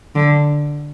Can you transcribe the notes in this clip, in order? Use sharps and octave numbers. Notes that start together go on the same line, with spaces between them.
D3